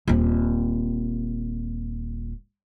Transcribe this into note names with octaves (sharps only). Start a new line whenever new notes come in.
D#1 C4